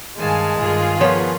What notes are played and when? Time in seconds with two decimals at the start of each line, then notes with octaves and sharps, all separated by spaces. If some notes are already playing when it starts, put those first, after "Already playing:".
0.19 G2 D#3 G#3 F5 G#5 A5
0.58 G2 D#3 F4 G#4
1.01 F3 B3 A#4 C#5